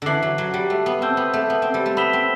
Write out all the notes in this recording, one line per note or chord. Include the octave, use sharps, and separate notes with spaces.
D3 E3 A5 D6 F#6 C7 F#7
F#3
F#3
G3
A3
B3
C4 A5 E6 G6
B3
A3
B3
C4
G3
A3
B3 B5 E6 B6 E7 G7
C4